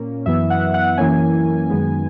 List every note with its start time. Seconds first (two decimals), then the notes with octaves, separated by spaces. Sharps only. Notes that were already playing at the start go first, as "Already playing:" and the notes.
Already playing: A#2 A#3 C#4
0.26 F#2 E3 B3 E5
0.50 F#5
0.74 F#5
0.97 F#2 E3 A#3 C#4 G#5
1.70 F#2 D#3 G#3 B3